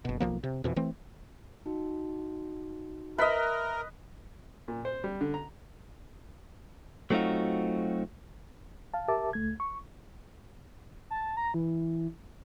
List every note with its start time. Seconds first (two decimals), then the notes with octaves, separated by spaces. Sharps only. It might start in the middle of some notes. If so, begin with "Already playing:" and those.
0.05 F#1 B2
0.20 B1 F#2 F3 A#3
0.43 C3
0.64 F2 B2 E3
0.76 E3 A3 C4
1.66 D#4 F#4
3.18 A#4 B4 D#5 E5 B6
4.68 A#2
4.85 C5
5.04 G3
5.21 D3
5.34 A#5
7.10 F#3 A3 C4 D#4 F4 F#4
8.94 F5 A5
9.08 G4 A#4 E5 A5 D6
9.33 C#2 A3 G#6
9.60 C#6
11.10 A5
11.37 A#5
11.54 E3